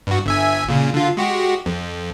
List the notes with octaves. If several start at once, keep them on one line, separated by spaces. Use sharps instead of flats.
G2 F#4
G1 E5 G#5
A#2 C#3
D3 F4
G#3 F#4 G4
F2